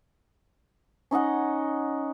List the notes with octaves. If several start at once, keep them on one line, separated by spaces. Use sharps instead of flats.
C#4 D#4 D#5 F#5